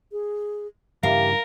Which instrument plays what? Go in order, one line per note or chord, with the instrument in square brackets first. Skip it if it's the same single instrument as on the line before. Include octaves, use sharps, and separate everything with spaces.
[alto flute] G#4
[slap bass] G2 C#3 E3 [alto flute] G4 [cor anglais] A#4 [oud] F5